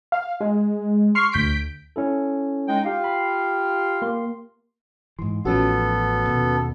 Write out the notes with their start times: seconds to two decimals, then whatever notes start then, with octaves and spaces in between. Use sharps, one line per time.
0.12 F5
0.41 G#3
1.15 C6 C#6 F6 C7
1.32 D2 G6 B6 D7
1.96 C#4 E4 A4
2.67 G#3 D#4 G5
2.85 F4 G4 F5
3.04 B5
4.02 A#3 C6
5.19 G#2 E3 C6
5.45 A1 F3 B3 C#4 F#4 A4
6.27 D#2 B2